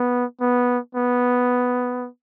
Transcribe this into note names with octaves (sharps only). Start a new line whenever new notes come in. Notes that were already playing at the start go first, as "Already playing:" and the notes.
Already playing: B3
B3
B3